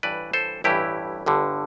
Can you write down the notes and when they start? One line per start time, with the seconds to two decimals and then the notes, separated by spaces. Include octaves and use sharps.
0.03 A1 G2 E3 B4 D5
0.33 A4 C5
0.64 A1 G2 E3 E4 G4
1.26 G1 G2 D3